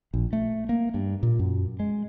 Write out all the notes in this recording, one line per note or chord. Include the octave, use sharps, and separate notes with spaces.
A#1
A3
A#3
G2
A#2
F#2
G#3